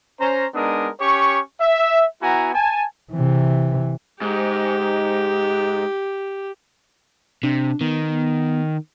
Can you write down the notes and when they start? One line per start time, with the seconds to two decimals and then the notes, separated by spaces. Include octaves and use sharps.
0.20 C#4 C5 A#5
0.54 G#3 B3 D4 D#4 A#4 D#6
1.00 C#4 G4 C#5 C#6
1.61 E5
2.22 B3 E4 F#4 F#5 G#5 A#5
2.54 G#5 A5
3.13 C3 E3
4.21 G#2 G4
7.43 C3 D4
7.81 D#3 B3